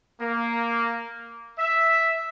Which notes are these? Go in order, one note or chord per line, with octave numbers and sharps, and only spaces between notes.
A#3
E5